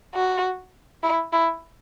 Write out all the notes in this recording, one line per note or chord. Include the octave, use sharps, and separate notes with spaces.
F#4
E4
E4